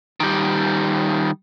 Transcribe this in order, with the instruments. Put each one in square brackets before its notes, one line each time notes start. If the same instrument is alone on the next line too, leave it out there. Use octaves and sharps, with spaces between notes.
[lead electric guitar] D#3 G3